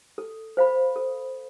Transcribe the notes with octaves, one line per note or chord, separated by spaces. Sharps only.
A4
C5 F5 B5
A4